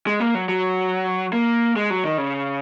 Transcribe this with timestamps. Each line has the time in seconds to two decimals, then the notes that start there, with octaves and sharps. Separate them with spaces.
0.07 G#3
0.20 A#3
0.35 F#3
0.49 F#3
1.33 A#3
1.76 G#3
1.90 F#3
2.05 D#3
2.18 C#3